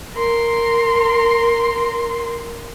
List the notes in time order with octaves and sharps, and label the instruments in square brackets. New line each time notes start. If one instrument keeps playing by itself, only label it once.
[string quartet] A#4 C6